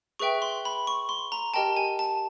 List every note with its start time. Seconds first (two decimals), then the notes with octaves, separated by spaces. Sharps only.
0.19 G#4 B4 E5 G5 C#6
0.42 C6
0.65 B5
0.87 C#6
1.09 C6
1.32 A#5
1.54 G4 A#4 D#5 G5 A5
1.77 G#5
1.99 A5